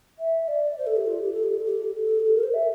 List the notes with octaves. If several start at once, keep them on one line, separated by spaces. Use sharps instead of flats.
E5
D5
C5
A4
G4
F4
G4
A4
G4
A4
G4
A4
G4
A4
A#4
C5
E5